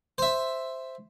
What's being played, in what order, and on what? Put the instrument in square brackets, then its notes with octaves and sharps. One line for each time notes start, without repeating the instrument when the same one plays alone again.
[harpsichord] C5 E5